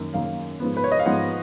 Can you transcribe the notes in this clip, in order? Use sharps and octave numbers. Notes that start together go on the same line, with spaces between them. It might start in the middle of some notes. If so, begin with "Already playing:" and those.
Already playing: F#2 D#3 A#3
F#2 D#3 A#3 F5
G#2 F3 B3
B4
C#5
D#5
F5
G#2 F3 B3 F#5